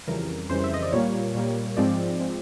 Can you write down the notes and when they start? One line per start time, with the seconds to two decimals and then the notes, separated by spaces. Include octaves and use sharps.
0.08 F2 C#3 E3 G3 A#4
0.49 F2 C#3 E3 G3 C5
0.64 E5
0.74 D#5
0.82 D5
0.92 A#2 G3 A#3 C#5
1.35 A#2 G3 A#3
1.77 G#2 F3 G#3 C4 D5
2.20 F3 G#3 C4